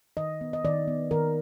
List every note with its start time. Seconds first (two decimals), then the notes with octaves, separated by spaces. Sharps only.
0.17 D#3 D#5
0.41 B3
0.53 D#5
0.65 D#3 D5
0.88 B3
1.11 D#3 A#4